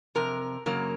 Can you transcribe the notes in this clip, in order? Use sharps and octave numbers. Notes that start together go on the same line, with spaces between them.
F2 C3 A#4
F#2 C#3 F#3 A#3 A#4